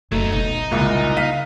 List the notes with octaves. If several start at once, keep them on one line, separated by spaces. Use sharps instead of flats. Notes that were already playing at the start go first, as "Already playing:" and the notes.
F#1 F#3 A3 D#4
B1 C4 D#4
C2 A#2 C#3 G3 G#3
F5 B6 D#7